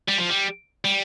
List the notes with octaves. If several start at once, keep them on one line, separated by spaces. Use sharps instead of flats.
G3
F3
G3
G3